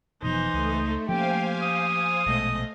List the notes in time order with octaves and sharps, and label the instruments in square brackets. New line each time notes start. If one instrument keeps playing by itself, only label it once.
[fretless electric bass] E1 B2 F3 [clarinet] E3 [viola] D#4 C5
[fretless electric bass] C#2 [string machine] A3
[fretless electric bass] F3 A#3 C#4 [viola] G4 [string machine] C5 F5 G#5 [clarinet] G5
[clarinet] D#6
[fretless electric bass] A#1 B2 G#3 [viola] A3 D#5